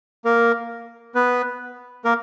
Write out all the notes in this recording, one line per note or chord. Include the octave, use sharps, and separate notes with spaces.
A#3 A#4
B3 B4
A#3 A#4